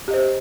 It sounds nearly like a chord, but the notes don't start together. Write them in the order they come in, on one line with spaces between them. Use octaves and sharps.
G4 D#5 C5